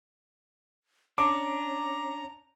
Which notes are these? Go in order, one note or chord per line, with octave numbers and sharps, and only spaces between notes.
C#4 D4 A#5 D6